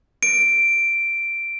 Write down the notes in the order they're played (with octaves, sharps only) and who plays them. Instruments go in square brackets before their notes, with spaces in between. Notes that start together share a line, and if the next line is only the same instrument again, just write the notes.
[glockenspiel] D7